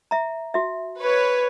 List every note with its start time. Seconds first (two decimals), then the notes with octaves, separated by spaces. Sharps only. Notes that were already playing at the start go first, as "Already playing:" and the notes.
0.11 E5 A#5
0.54 F#4 E5
0.99 B4 C#5